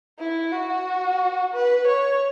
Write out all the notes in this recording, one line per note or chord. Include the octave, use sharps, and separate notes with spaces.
E4
F#4
B4
C#5